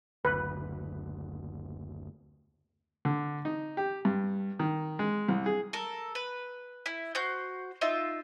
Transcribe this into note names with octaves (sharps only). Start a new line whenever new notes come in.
F#1 D2 B4
D3
D#4
G4
G2
D#3
G#3
C2
G#4
A4 A#4
B4
E4
F#4 C5 G6
D#4 F4 E5